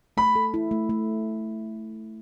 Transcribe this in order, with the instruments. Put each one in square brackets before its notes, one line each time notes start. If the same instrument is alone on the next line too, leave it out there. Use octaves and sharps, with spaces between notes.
[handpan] A3 [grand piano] B5
[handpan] A4
E4
A3
A3